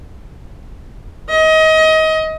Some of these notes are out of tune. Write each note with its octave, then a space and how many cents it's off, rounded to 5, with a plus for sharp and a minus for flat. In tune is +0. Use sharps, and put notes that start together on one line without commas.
D#5 +25